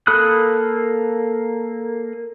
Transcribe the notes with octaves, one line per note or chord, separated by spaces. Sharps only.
A#3 A4 B5 D#6 F#6